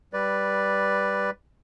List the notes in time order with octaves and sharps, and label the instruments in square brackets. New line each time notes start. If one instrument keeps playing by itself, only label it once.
[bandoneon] G3 B4 D5